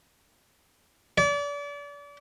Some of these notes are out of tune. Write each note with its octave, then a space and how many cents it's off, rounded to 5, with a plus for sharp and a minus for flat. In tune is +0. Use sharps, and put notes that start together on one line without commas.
D5 -35